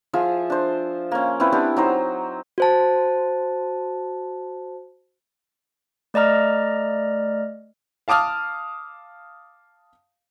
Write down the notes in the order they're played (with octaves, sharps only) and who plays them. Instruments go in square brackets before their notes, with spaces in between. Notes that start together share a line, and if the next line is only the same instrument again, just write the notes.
[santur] F3 F4 G#4 E5
D4 C5
A#3 C#4
C4 C#4 E4 B4
B3 C4 D4 G4
F#3 D#4 C5
[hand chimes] F#4 C5 A5
[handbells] A3 D5 D#5 A#5 F6
[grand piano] F5 A5 D6 D#6 F6